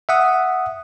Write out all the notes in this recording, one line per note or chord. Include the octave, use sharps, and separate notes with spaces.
E5 F#5 D#6